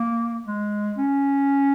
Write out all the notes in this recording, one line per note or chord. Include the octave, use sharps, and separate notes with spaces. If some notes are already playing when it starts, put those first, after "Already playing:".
Already playing: A#3
G#3
C#4